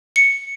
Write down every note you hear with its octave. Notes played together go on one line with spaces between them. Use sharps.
C#7